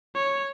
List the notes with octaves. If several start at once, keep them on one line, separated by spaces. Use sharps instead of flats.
C#5